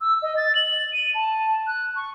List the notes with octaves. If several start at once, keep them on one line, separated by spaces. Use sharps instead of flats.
E6
D#5
A6
F#7
D#7
A5
F#6
C#6